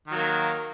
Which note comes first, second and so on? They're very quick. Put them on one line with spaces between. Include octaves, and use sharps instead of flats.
D#3 F#3 A#3